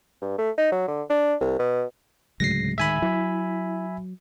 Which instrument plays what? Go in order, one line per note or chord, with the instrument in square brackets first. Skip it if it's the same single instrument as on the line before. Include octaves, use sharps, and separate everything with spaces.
[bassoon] G2
A3
D#4
F#3
D3
D4
C2
B2
[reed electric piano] D2 A2 [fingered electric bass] C#3 F#3 G#3 [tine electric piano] A#6 C7
[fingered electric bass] D#3 G#3 [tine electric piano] E5 G#5 B5
[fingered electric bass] F#3 [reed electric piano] E4